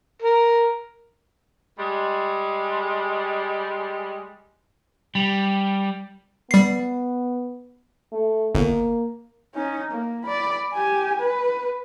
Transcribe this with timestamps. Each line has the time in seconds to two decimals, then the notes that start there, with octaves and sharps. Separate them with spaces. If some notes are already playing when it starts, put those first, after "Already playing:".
0.22 A#4
1.78 G3 G#3
5.15 G3
6.51 G3 B3 C7
8.12 A3
8.55 G1 A#3
9.54 C#4 D#4
9.91 A#3
10.24 D5 B5
10.73 G4 G#5
11.20 B4